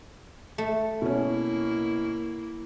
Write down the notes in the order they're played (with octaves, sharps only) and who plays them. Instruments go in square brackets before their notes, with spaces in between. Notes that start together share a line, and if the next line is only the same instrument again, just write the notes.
[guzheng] A3
[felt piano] B2 C#4 [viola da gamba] A#3 E4